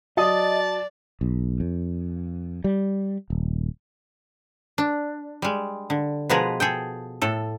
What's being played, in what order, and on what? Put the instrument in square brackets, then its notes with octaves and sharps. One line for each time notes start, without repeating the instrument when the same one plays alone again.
[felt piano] F#3 [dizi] D5 [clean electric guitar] D#5 [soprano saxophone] A5
[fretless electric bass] B1
F2
G3
D#1
[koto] D4
G3 G#3
D3
B2 F3 G#3 G#4 B4 A#5
G#4 A4 G5
A2 A4